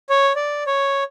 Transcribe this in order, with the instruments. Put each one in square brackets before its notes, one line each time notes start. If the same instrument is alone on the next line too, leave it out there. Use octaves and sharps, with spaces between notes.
[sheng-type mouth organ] C#5
D5
C#5